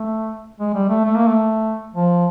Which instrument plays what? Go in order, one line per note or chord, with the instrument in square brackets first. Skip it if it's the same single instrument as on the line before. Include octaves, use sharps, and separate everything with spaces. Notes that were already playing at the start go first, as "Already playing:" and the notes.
Already playing: [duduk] A3
G#3
G3
A3
A3
A#3
A3
F3